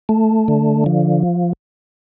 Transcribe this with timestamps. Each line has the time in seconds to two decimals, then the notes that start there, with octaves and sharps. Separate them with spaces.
0.09 A3
0.48 D3
0.86 F3